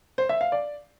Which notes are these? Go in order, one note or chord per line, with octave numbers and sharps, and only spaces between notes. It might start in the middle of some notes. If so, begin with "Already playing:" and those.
C5
E5
F5
D5